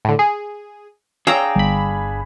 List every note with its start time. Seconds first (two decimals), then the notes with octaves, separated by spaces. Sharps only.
0.05 A2 D3
0.19 G#4
1.27 D4 G#4 C#5 F5 G5 A#5 E6
1.56 G1 B5